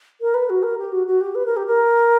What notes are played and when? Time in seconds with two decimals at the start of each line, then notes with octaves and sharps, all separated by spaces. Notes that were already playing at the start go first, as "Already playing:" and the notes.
0.21 A#4
0.34 B4
0.50 F#4
0.63 A#4
0.78 G4
0.92 F#4
1.07 F#4
1.21 G4
1.35 B4
1.46 A#4
1.57 G4
1.66 A#4